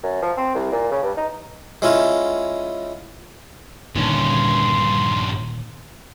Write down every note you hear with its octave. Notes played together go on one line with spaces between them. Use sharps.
F#2
F3
C4
C2
A#2
C#3
G2
D#4
G#3 C#4 E4 F4
D#1 G2 A#2 D3 D#3 C#4 C6